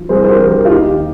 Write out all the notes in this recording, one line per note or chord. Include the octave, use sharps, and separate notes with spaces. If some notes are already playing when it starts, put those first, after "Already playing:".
Already playing: F3
C2 G#4 C5
C5
G4 A#4
F3
G4 A#4
F4
D#2 D#4 G4